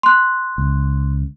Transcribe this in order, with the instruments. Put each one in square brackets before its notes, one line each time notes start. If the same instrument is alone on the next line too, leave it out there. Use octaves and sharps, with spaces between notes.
[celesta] C6 F#6
[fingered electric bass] C#2